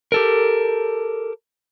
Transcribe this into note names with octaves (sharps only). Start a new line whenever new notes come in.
G4 A4 A#4